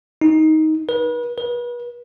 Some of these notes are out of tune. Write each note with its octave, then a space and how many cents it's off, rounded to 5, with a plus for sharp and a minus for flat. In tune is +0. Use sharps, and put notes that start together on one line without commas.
D#4 +15
B4 -35
B4 -35